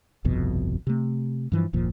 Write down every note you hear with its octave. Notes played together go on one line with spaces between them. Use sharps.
G1 C2 F2 B2
C3 A3
G2 E3 F3
F#1 D#2 A#2 F3